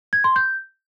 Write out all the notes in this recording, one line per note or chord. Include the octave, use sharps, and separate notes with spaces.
G#6
C6
G6